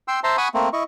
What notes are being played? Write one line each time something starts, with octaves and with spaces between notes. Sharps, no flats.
G5 C6 E6
C5 E5 A5 A#5 C6
F#5 G#5 B5 C#6 D#6
A3 A#3 C4
E4 D#5 C#6